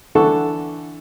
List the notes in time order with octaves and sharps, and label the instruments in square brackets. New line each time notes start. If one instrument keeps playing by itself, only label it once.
[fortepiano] D3 E3 A4 F#5 C#6